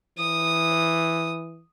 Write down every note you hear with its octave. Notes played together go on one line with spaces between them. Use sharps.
E3 D#6